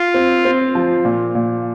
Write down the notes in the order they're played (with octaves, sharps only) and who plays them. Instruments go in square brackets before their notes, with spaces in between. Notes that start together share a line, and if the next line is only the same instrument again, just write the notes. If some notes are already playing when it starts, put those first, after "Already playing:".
Already playing: [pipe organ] F4
[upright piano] C4
C4
F3
A#2
A#2